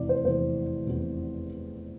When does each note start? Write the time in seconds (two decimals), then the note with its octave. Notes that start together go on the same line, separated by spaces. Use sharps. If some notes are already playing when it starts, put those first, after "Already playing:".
Already playing: F1 E2 C3 E3 D5
0.09 C5
0.25 F1 E2 C3 E3 C5
0.87 F1 E2 C3 E3